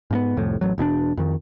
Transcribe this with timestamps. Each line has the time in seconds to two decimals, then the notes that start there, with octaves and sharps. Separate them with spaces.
0.11 G#2 A#3 B3
0.37 C2 F2 A2
0.61 A1 F#3
0.78 E1 B2 C#4 D4
1.17 F2 D#3